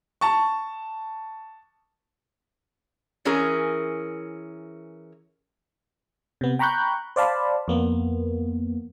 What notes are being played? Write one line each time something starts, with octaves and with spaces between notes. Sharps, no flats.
A5 C#6
E3 C#4 G#4 A#4
C3 B3
G5 A#5 B5 C#6 F#6 G6
C5 D5 F5 A5 B5
F2 A#3 B3